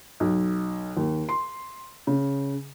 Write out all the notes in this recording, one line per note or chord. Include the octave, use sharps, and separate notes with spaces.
B1
D#2
C6
C#3